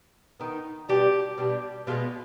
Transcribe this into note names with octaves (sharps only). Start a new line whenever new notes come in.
D#3 B3 D#4
B2 G3 B3 D4 G4
B2 G3 B3 D4
B2 G#3 B3 F4